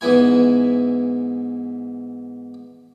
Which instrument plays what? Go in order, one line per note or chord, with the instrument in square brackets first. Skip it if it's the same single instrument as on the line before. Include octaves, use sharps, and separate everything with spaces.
[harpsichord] G#2 E3 B3 E4 G#5